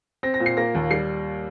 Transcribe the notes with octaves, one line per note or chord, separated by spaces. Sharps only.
C4 A#6
A#6
A#2
C7
A#3 A#6
D#2
G3 C7